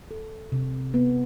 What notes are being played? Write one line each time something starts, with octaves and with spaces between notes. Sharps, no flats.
A4
C3
B3